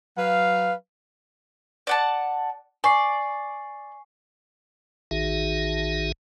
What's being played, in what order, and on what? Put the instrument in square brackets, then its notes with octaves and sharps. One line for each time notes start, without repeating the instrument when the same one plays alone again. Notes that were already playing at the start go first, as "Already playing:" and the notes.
[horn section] F#3 B4 F5
[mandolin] D5 F#5 A5
[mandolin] D5 [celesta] G#5 C#6 C7
[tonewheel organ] A1 D#3 D#4 F#4 G#4 E5